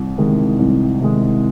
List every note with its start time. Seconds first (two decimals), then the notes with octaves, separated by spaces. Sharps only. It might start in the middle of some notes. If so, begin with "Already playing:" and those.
Already playing: C2
0.18 C3 D#3 G#3
0.59 C2
1.01 C3 D#3 G#3